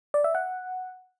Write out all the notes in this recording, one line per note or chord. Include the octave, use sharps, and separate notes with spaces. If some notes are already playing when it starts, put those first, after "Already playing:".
D5
E5
F#5